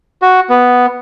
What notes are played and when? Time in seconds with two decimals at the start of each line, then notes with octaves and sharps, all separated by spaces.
0.22 F#4
0.50 B3